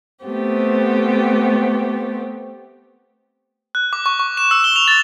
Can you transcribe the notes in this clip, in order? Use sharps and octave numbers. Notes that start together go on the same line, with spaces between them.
A3 B3 C4 G4
F#6
D6
C#6
C#6
E7
E6
G7
F7
A6